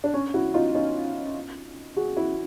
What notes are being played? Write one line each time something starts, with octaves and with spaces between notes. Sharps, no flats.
D4
C#4
E4 F#4
D#4 F4
C#4 D#4
F#4 G#4
E4 F#4